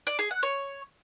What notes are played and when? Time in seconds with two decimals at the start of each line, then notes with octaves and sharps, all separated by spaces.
0.07 D5
0.19 G#4
0.31 F#5
0.43 C#5